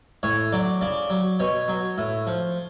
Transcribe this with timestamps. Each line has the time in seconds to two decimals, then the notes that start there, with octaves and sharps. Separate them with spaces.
0.23 A2 C#5
0.53 F#3 D5
0.81 C#3 D5
1.10 F#3
1.39 B2 C#5
1.68 F#3
1.98 A2
2.27 F3